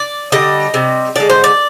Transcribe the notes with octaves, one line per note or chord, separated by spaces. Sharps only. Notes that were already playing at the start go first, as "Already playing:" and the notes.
Already playing: D5
D3 G3 D#5
C3 G3
D3 G#3 D5
C5
D5